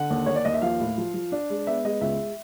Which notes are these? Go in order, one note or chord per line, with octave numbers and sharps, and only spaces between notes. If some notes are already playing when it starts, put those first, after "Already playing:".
Already playing: D3 F#5
D#2
D#2 C#5
D5
D#2 D#5
E5
F3 F5
A2
F3
F3
D4
G#3
B3 E5
G#3 D#5
C#2 E5